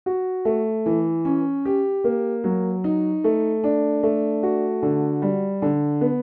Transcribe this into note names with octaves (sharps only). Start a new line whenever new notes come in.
F#4
A3
E3
C#4
G4
A#3
F#3
D#4
A3
D4
A3
F#4
D3
G3
D3
B3